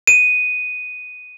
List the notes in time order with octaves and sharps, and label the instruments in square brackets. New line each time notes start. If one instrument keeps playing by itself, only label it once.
[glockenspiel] D#7